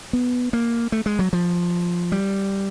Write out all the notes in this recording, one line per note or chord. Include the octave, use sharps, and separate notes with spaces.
B3
A#3
A3
G#3
F#3
F3
G3